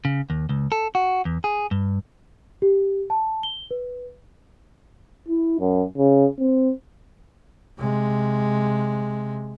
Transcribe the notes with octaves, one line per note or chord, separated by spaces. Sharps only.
C#3
D#2
C#2
A4
F#4
E2
G#4
G2
G4
A5
G7
B4
E4
F#2
C#3
C4
C3 G#3